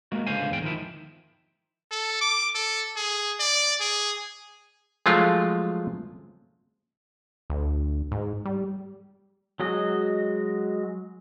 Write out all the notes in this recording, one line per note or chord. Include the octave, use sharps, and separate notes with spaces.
G#3 A#3 F#4
C#2 D3 C5 F5 G#5
E2 G#2 G5
D#3 F3 E4
A4
D6
A4
G#4
D5
G#4
F3 F#3 G#3 A3 F4
D2
G#2
G3
F#3 G#3 F#4 D#5